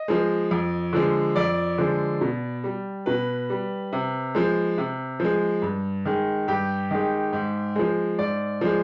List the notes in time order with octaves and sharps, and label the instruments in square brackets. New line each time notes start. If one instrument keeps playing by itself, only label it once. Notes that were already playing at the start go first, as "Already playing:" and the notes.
Already playing: [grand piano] D#5
F3 G#3
F2
D3 F3 G#3
F2 D5
D3 F3 G#3
B2
G3
B2 B4
G3
C3
F3 G#3
C3
F3 G#3
G2
D#3 G#3
G2 G4
D#3 G#3
G#2
F3 G#3
G#2 D5
F3 G#3